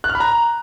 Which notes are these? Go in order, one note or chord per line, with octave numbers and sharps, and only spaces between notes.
F#6
F6
B5
A#5